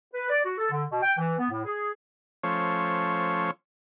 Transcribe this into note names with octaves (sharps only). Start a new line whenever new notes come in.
B4
D5
F#4
A4
D3
B2
G5
E3
B3
A2
G#4
F3 A3 C#4 C5 C#5